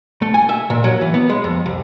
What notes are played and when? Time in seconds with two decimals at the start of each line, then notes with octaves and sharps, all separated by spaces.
0.22 A3
0.34 G#5
0.49 E5
0.70 A#2
0.84 F#3
1.01 E3
1.14 B3
1.29 G#3
1.44 F2
1.66 C2